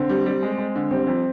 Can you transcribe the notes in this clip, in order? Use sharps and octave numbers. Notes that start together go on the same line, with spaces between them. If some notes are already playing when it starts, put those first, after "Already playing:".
Already playing: D3 C4
G3
G3
G#3
G#3
D3
G3 C4
F2